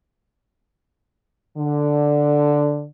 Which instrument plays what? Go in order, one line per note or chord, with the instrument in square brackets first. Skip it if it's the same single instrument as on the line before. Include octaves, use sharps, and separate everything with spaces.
[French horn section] D3